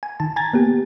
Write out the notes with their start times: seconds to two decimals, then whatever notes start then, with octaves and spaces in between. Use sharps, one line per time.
0.03 G#5
0.20 D#3 A5
0.36 G#5 A#5 G#6 A6
0.53 A#3 B3 G4